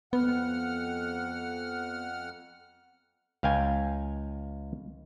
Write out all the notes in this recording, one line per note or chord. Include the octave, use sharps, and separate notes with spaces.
F2 B3 F#5 F6
C#2 F5 G5 G#5